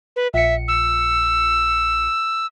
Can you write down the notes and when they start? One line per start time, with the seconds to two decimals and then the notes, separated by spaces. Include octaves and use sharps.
0.16 B4
0.34 A#1 E5 C#7
0.68 E6